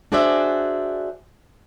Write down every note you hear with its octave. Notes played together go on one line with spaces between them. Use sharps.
D4 F#4 G#4 C5 D5 E5